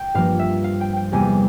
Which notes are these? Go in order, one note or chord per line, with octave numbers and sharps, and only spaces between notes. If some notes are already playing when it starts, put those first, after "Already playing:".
Already playing: G5
G2 F3 A#3 F5
E5
F5
G5
G5
E2 C3 G3 A#3 G#5